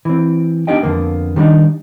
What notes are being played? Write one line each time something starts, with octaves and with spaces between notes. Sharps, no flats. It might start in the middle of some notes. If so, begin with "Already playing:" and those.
E3 C4
B3 D4 D#4 G4 D#5 G5
F2 D3 A#3 B3
D#3 G3 A#3 B3 D4 D#4